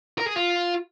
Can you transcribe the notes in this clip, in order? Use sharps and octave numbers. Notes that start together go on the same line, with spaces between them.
A#4
G#4
F4